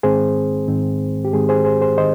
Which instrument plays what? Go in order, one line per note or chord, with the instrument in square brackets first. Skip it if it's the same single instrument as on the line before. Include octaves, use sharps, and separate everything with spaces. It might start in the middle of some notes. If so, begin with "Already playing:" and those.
[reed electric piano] G#2 D#3 G#3 C4 G#4 C5
G#2 D#3 G#3 C4
G4
G#2 D#3 G#3 C4 G#4
G#4 C5
G#4 C5
G#4 C5
D#3 C5 D#5